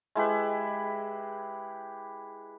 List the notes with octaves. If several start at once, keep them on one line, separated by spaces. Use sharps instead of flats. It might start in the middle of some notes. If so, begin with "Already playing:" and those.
G#3 E4 G4 B4